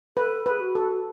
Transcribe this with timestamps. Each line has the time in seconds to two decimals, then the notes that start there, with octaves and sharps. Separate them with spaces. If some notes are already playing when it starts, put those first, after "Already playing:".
0.17 A4 B4
0.46 G#4 B4
0.60 F#4
0.75 A4